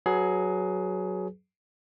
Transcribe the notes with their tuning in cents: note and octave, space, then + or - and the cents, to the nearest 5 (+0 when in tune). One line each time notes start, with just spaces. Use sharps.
F#3 +5 G#4 +20 B4 +0